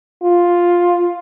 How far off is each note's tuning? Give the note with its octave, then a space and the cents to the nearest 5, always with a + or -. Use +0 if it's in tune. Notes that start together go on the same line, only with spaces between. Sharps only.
F4 +5